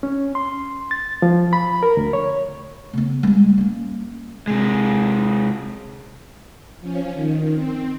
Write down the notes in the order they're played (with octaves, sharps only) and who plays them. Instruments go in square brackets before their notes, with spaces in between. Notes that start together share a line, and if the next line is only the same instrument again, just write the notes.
[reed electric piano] C#4
C6
A6
F3
B5
A#4
D2
C#5
[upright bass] C#3 B3
G3 G#3
A#3 C#4
[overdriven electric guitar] C3 G#3
[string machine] F3 C#4
D#3
C4